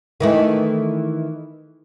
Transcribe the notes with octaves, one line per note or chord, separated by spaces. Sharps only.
D#3 E3 A3